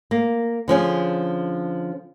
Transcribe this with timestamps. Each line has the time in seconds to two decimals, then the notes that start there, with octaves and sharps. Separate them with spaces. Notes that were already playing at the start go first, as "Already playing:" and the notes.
0.11 A#3
0.68 D3 F3 C#4 G#4